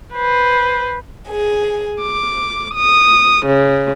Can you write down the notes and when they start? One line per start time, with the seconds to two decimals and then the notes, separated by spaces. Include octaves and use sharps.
0.13 B4 C5
1.28 G#4
2.01 D6
2.76 D#6
3.47 C#3